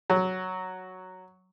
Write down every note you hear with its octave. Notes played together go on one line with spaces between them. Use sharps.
F#3